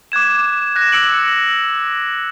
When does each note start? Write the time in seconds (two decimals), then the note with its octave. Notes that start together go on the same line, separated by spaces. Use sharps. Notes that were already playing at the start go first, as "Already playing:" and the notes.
0.12 D6 F#6 G#6 E7
0.76 F#6 A#6 E7
0.92 E6 C#7 D7 F#7